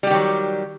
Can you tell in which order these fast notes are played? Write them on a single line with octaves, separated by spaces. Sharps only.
G3 G4 D#3 F#3